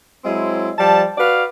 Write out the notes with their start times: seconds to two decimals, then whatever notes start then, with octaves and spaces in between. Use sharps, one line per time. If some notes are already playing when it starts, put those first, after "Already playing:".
0.24 F#3 G#3 C4 E4
0.78 F3 G3 A5
1.17 F#4 B4 D5 F5